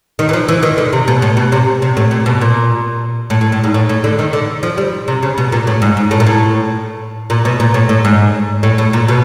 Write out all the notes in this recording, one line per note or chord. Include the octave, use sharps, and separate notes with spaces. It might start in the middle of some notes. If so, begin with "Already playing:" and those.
D#3
E3
F3
E3
D#3
D3
C3
B2
A2
B2
C3
C3
A2
A#2
B2
A#2
A2
A2
A2
G#2
A2
A2
D3
D#3
D3
F3
G3
C3
C#3
B2
A#2
A2
G#2
G#2
A2
A#2
A2
A#2
B2
A#2
A2
A2
G#2
A2
A2
A#2
B2